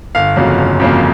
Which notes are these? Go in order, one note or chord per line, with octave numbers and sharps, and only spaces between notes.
G1 F5
F2 C#3 F#3 A#3
G1
F2 C#3 F#3 A#3